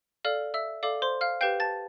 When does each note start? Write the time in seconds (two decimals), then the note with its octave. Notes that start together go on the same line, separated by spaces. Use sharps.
0.25 A4 D5 F5 F6
0.54 E5 E6
0.83 A4 D5 F5 D6
1.02 C5 C6
1.21 F5 F6
1.41 G4 B4 F5 G5 G6
1.60 A5 A6